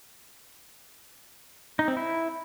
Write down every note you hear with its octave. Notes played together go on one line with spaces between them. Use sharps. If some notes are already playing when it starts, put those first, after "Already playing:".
D#4
C4
E4